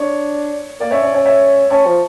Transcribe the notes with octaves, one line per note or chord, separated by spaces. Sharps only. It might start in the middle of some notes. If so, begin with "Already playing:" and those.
Already playing: D4 C#5
A#3 D5
C#4 C#5 E5
C#4 D5
C#4 C#5 E5
C#5 E5
C#4 A5 C#6
F3